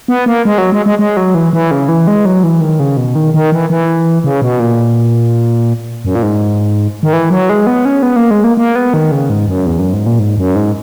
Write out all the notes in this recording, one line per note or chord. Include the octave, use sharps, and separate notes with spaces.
B3
A#3
G#3
F#3
G#3
G#3
G#3
F#3
E3
E3
C#3
E3
G#3
F#3
E3
D#3
C#3
B2
D#3
D#3
E3
E3
C#3
B2
A#2
F#2
A#2
G#2
D#3
E3
F#3
G#3
B3
C#4
B3
A#3
G#3
A#3
A#3
B3
D#3
C#3
G#2
F#2
E2
F#2
G#2
A#2
G#2
F#2
G#2